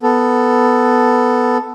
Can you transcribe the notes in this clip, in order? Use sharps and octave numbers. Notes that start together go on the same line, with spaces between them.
B3 A4